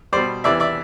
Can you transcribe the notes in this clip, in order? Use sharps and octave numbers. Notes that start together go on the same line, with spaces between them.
B2 G3 C5 D5
E2 C3 E3 D5 E5
D5 E5